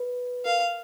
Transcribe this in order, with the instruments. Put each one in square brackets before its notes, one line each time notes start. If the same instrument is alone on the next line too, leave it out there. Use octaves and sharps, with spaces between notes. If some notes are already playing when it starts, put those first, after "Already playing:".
Already playing: [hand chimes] B4
[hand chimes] A#4 [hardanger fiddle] F5